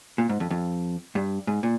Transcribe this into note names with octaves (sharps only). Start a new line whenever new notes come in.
A#2
G#2
F2
F2
G2
G#2
A#2